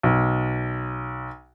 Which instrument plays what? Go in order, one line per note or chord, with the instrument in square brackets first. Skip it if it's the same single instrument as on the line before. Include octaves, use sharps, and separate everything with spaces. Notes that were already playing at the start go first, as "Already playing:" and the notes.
[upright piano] B1